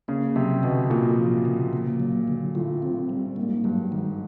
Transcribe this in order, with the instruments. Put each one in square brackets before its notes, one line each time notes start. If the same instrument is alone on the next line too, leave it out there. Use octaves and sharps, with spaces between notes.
[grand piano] C#3 [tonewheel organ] A#3
[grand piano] C3 [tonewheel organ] F#3
[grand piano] B2 [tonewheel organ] D3
[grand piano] A#2 [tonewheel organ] A#3
[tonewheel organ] F3
C#3
A#3
F#3
D3
[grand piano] A2 [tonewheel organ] F4
[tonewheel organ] C4
G3
[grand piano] G#2 [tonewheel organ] A#3
[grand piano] G2 [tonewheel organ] F#3
[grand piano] G#2 [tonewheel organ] D#3